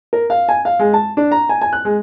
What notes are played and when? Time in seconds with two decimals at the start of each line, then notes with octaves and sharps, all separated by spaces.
0.13 A#4
0.30 F5
0.49 G#5
0.65 F5
0.80 G#3
0.94 A5
1.17 D4
1.32 A#5
1.49 G#5
1.62 G#5
1.73 F#6
1.85 G#3